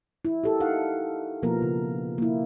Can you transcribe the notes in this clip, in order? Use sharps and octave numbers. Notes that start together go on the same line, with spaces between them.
E4
G4 A4 A#4
D#4 F5 F#5
B2 F3 A#3 B3 A#4
C#3
A#3 E4